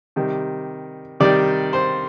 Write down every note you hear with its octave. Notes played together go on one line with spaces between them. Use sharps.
C3 D#3 G3
C3 D#3 G3 D5
C5